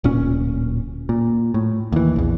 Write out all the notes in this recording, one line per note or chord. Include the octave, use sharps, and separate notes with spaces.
D1 A#2 C#4
A#2
A2
D#2 E3
A#1 E2